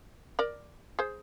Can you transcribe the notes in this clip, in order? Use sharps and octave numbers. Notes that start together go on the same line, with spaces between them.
A#4 D5
G#4 C5